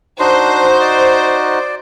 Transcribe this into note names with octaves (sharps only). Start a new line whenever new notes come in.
D4 D#4 F#4 C5 D#5 C6
D5